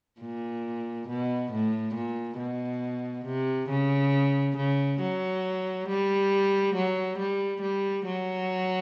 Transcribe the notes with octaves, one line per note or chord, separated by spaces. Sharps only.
A#2
B2
A2
A#2
B2
C3
C#3
C#3
F#3
G3
F#3
G3
G3
F#3